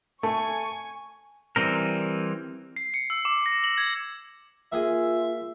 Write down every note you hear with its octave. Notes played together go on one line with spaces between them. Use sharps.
A3 G#5 C#6
E3 G3 C4 A#4
C7
C#7
E6
D6
A#6
F#7
G#6
A#3 F4 G#4 E5 G#5